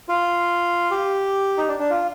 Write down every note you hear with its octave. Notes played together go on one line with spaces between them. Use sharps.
F4
G4
D#4
D4
D4
F4